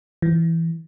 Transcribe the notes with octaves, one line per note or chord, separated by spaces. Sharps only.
E3